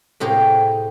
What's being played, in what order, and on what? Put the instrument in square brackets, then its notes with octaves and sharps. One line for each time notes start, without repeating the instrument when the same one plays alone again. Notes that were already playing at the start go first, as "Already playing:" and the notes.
[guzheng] A2 C3 G4 G#4 A#4 F5